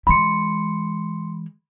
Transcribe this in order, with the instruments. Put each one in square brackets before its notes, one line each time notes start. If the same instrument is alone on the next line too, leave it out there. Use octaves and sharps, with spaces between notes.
[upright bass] E3 G#3 [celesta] B5 C6 C#7